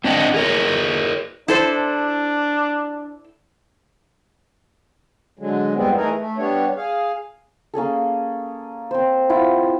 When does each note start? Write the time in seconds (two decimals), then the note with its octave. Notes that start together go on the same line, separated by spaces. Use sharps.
0.04 C4 D4 C5 D#5 F#5
0.34 G#4 A#4 C#5
1.48 D4 E4 A4 C5
5.39 D3 F#3 G#3
5.75 E2 G2 G3 G#3 B3 C4
5.95 E3 A3 D#4 G#4 A#4
6.18 A3
6.38 G3 B3 D4 C#5
6.76 G#4 F5
7.74 A#3 C#4 G#4 A4
8.91 C4 C5
9.29 E4 F4 F#5